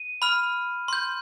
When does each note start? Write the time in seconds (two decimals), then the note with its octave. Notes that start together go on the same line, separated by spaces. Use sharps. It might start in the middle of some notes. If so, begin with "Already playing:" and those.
Already playing: D#7
0.22 B5 F6
0.88 C6 G6